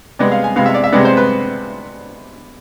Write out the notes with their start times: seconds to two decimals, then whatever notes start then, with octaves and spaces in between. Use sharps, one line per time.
0.19 C3 G#3 B3 D5
0.32 F5
0.44 G#5
0.56 C3 G#3 B3 F5
0.66 E5
0.74 D5
0.84 E5
0.92 C3 G#3 B3 D5
1.05 C5
1.17 B4